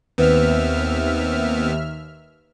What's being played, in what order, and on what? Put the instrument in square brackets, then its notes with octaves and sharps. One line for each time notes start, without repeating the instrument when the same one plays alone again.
[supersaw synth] D#2 E5 F6 [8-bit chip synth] B3 C4 [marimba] B4